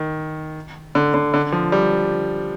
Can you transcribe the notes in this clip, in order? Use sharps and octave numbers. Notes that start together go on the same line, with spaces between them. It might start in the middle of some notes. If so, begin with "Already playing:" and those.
Already playing: D#3
D3
D3
D3
F3
G3